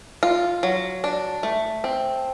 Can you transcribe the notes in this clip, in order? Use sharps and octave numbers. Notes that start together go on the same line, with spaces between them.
F4
F#3
D4
A3
C4